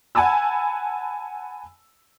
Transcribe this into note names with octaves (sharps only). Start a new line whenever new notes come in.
F#5 G#5 A5 B5 E6